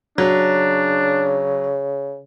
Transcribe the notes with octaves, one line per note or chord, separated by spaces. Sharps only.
C#3 F#3 D4